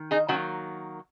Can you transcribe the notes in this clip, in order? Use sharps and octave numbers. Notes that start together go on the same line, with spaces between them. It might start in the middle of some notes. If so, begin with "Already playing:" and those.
Already playing: D#3
D#4 G#4
D#3 F#3 A#3 C#4 F#4